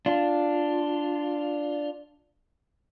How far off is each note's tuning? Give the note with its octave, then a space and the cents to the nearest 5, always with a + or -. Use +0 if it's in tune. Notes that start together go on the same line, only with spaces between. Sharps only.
D4 +0 F4 +0